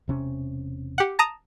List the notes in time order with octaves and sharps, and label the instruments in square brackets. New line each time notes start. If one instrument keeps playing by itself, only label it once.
[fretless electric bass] E1 C3 C#4
[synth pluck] G4 F#5
A5 A#5 D#6